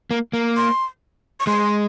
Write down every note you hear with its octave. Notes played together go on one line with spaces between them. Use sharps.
A#3
A#3
C6
C#6
G#3 C6